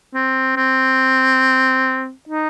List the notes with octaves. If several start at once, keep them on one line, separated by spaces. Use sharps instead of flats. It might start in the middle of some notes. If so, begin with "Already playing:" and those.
C4
C4
D#4